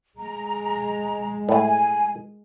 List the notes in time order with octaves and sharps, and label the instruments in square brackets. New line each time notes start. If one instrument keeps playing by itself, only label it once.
[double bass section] G#3 [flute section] A#5
[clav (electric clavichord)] A2 A3 [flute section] G#5